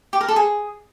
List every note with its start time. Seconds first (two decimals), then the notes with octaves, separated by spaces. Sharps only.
0.13 G4
0.21 A#4
0.28 A4
0.36 G#4